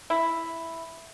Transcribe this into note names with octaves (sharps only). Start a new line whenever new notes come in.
E4